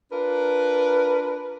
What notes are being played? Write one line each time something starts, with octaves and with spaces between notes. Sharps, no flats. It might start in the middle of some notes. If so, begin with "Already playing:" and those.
D4 F4 A#4 B4